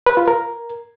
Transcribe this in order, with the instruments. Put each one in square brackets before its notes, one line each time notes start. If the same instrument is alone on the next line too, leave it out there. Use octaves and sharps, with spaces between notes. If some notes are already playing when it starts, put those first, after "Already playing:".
[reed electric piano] B4
F4
A#4